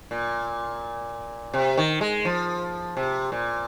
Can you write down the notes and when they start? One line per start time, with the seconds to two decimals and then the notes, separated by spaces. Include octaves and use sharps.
0.11 A#2
1.54 C3
1.78 D#3
2.01 G#3
2.25 F3
2.97 C3
3.32 A#2